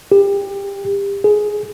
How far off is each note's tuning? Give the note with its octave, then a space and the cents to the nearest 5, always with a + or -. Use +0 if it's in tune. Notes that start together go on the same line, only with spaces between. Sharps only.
G4 +25
G#4 +10